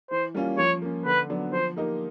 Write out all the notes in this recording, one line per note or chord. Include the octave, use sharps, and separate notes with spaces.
E3 C5
G3 A#3 C#4 F4
F3 C#5
A#3 C#4
D3 B4
F#3 B3 D4
F3 C5
A#3 D#4 G4 A#4